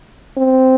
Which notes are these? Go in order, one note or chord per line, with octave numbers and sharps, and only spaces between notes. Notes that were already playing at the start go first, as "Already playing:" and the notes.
C4